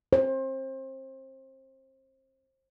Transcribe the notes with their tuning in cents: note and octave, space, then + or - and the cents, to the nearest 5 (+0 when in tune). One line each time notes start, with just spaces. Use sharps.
C5 +25